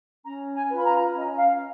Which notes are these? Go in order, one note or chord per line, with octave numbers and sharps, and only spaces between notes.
C#4 A#5
G#5
F4 B4
B5
A#5
C#4 D#5
F5